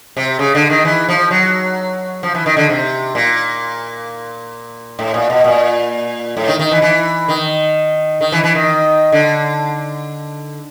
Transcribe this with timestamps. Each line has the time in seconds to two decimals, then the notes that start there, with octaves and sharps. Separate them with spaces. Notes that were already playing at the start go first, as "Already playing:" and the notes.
0.17 C3
0.39 C#3
0.55 D3
0.70 D#3
0.85 E3
1.09 F3
1.31 F#3
2.23 F3
2.35 E3
2.46 D#3
2.57 D3
2.69 C3
3.15 A#2
4.99 A2
5.14 A#2
5.30 B2
5.44 A#2
6.37 A2
6.48 D#3
6.59 D#3
6.72 E3
6.82 E3
7.28 D#3
8.21 D#3
8.32 E3
8.44 E3
8.55 D#3
9.12 D3